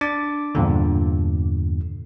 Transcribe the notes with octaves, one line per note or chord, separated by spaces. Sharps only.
D4 D6 A6
E2 G2 A#2 D3